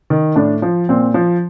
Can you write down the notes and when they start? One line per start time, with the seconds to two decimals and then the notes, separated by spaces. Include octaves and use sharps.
0.10 D#3
0.36 A2 D4
0.62 F3
0.89 A#2 C4
1.14 F3